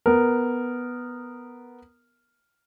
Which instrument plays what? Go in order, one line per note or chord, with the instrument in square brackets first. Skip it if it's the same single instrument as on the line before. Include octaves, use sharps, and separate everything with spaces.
[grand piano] B3 A#4